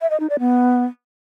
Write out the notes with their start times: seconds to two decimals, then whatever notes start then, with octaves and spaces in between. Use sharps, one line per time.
0.01 E5
0.10 D#5
0.20 D#4
0.30 D5
0.39 B3